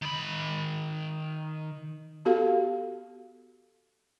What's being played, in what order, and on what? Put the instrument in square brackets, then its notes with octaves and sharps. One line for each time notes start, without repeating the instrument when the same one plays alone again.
[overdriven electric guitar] D#3 B5
[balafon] B3 F#4 G4 A4 F5